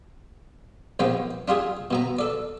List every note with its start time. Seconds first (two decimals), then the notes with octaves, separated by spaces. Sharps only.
0.99 A#1 D#2 F3 B3 G5
1.48 D4 F4 G4 G#4
1.91 B2 B3 A#5
2.19 A4 D5